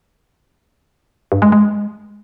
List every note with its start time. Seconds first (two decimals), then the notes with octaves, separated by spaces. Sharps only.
1.32 G2
1.42 G#3
1.52 G#3